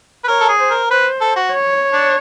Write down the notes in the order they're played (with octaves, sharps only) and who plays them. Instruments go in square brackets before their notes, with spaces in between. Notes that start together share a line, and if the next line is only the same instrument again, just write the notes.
[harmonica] B4
[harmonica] A#4 [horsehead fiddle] C#5
[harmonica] A4
G#4
[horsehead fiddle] C5
[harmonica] A#4
[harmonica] B4 [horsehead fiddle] C5
[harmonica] A4
F#4
[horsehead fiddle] C#5
[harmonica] D4